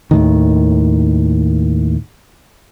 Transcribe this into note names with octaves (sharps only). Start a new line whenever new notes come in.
D#2 A2 D#3